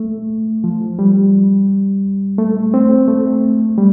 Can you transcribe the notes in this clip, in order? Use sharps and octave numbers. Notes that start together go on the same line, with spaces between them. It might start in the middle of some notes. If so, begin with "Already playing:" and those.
Already playing: A3
F3
G3
A3
C4
A3
G3